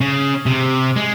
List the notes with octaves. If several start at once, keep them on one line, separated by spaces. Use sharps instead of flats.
C#3
C3
G#3